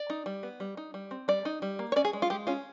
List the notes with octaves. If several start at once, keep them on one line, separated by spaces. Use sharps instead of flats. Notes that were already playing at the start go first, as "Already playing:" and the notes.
Already playing: D5
D#4
G3
B3
G3
D#4
G3
C4
G3 D5
D#4
G3
A#3
C#5
C#4 D5
G#4
G#3
F4
G#3 G4
C#4 F4